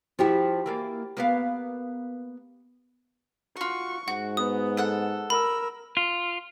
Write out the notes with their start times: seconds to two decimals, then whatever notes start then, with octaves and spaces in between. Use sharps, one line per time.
0.19 F3 E4 F#4 G4
0.66 E3 A#3 D5
1.17 A#3 B3 F5
3.57 F4 F#4 C#6
4.08 G#2 F#4 F#5
4.37 B3 D#6
4.77 A4 F#5 F#6
5.30 A#4 B5 E6
5.97 F4